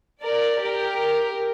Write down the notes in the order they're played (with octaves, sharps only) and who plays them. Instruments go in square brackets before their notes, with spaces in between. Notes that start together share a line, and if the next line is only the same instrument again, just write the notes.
[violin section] A#4 D5
G4 A#4